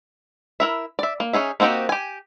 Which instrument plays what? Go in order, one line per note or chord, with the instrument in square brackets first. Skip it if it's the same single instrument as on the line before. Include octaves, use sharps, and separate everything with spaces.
[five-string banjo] E4 A#4 E5
D5 E5
A#3
C#4 D#4 G#4 E5
A#3 C4 D#4 F#4 G4
G4 G#5